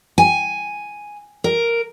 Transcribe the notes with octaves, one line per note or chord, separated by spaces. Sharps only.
G#5
A#4